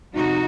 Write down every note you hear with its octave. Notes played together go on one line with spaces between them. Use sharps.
F2 C3 D#4 F#4